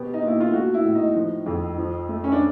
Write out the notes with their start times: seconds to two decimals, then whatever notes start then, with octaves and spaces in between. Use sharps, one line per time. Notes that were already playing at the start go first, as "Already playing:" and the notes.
Already playing: B2 B3 G4
0.14 D#4
0.22 A#2
0.27 E4
0.40 F4
0.53 A3 F#4
0.74 E4
0.84 A2
0.95 D#4
1.16 F3
1.46 F2
1.78 F3
2.09 A3
2.24 C#4
2.32 D4